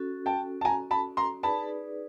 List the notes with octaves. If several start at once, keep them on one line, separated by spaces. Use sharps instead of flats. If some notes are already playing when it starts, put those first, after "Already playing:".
Already playing: C#4 F#4 A4
G5 A5
A5
G#5 A#5
A5 B5
A#5 C6
D#4 G#4 B4 D5 A5 B5